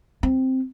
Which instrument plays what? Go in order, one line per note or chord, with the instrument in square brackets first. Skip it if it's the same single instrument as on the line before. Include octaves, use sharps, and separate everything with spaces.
[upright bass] C4